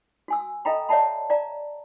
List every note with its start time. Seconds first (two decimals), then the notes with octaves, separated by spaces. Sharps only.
0.28 F#4 G#5 E6
0.65 A4 D#5 F5 G5 A#5 B5
0.89 C#5 D5 E5 F#5 A5 B5
1.30 D5 F5 A#5